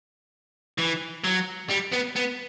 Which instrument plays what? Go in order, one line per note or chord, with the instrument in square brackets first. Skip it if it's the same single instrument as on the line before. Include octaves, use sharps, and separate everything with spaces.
[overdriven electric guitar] E3
F#3
G3
B3
B3